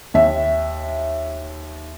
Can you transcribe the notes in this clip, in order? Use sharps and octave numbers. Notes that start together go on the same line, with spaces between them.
D#2 E5